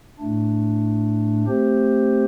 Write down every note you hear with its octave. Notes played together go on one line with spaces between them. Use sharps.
A2 A3 D4
A3 C4 G4 C5